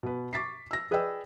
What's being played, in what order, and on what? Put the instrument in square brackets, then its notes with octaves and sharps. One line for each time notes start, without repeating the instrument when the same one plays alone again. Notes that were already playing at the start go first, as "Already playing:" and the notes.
[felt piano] B2 B4
C#6 D6 A6 B6 C7
E6 A#6
G#4 B4 D5 D#5 G5 E6